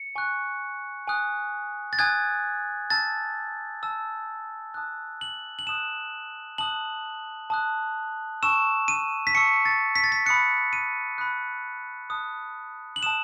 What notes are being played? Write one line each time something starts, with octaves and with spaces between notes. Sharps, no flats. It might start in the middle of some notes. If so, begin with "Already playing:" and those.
Already playing: C#7
G#5 C#6 F#6
G#5 D#6 F#6
A6
G#5 D#6 F#6 G#6
A5 E6 A6
A5 E6
A5 D#6 F#6
F#7
F#7
A5 D#6 F#6 E7
A5 D#6 F#6 F#7
A5 D#6 F#6
A5 C#6 E6 E7
D#7
B6
A5 C#6 E6 C#7
A6
B6
A6
B6
B5 D#6 F#6 C#7
D#7
B5 D#6 F#6
A5 D#6 F#6
F#7
A5 D#6 F#6 E7